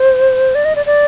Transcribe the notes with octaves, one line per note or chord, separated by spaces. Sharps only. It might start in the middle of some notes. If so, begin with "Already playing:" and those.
Already playing: C5
D5
D#5
D5
D5